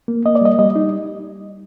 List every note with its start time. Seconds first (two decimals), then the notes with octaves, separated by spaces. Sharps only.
0.08 A#3
0.26 A#3 D#5
0.35 D5
0.42 G3 D#5
0.59 G3 D#5
0.76 D#4